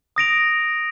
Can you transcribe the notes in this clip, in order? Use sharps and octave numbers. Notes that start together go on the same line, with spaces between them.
D#6 A#6 D7 F7